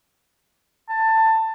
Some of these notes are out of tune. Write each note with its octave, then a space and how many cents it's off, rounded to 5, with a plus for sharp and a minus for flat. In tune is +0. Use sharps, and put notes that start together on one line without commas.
A5 +20